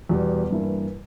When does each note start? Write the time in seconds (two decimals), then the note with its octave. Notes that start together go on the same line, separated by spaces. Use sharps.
0.09 E2 B2 G3
0.50 G2 E3 A#3 E4